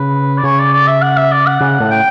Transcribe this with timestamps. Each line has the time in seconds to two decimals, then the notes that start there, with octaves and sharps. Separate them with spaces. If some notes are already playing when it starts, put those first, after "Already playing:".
Already playing: C#3 B4
0.37 D5
0.43 C#3 C#5
0.59 D5
0.73 D5
0.87 E5
1.02 F#5
1.17 E5
1.32 D5
1.47 F#5
1.60 C#3 F#5
1.80 A2
1.90 G5